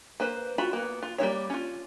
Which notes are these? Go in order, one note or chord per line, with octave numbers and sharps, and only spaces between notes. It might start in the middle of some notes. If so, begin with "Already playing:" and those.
A#3 B4 C5
F4 F#4 B5
A#3 B3
F4
G3 A#3 E4 C#5
C#4 F4